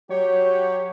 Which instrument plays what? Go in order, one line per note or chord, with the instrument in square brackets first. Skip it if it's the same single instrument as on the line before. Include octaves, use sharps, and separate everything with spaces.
[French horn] F#3 [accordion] G4 [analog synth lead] C#5